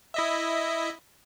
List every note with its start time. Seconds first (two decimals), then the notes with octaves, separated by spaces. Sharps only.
0.14 E4 D#5 E5